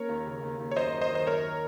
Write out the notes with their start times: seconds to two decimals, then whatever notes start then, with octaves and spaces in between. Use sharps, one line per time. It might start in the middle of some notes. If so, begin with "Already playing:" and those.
Already playing: A#3 C#4 A#4 C#5
0.09 D#2
0.26 C#3
0.43 D#2
0.59 D#2
0.71 C#5
0.76 F#2 C5 D#5
0.93 D#3
1.01 C5 D#5
1.10 D#3
1.15 C5
1.27 F#2 A#4 C#5